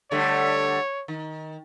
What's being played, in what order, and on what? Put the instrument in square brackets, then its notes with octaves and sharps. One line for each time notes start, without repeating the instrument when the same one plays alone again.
[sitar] D3 G3 A3 [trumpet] C#5
[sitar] D#3